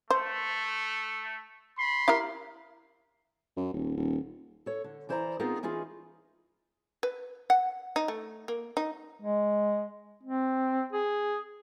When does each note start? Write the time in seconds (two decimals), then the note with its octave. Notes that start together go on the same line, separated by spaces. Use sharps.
0.11 A3 C5
1.78 B5 C6
2.08 E4 G4 A#4
3.56 F#2
3.73 D#1
3.96 D#1
4.66 A4 C#5
4.84 D3
5.09 E3 E4 C5 D5 F5 A#5
5.40 B3 C4 D#4 F4 G#4 A#4
5.63 E3 C#4 D#4 F4 G#4
7.03 B4
7.50 F#5
7.96 D#4
8.08 A3
8.48 A#3
8.77 D#4
9.22 G#3
10.23 C4
10.93 G#4